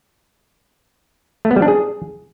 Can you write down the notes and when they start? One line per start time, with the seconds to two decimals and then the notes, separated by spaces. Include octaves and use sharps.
1.45 A3
1.51 B3
1.56 G3
1.62 D4
1.68 G#4